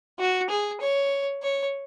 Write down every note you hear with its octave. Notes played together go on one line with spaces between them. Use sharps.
F#4
G#4
C#5
C#5